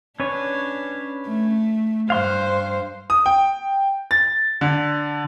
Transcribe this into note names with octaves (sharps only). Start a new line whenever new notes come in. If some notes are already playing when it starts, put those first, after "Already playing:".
C#4 D4 B4 C#5
A3
G2 C5 F5 C6 F#6
D#6
G5
A6
D3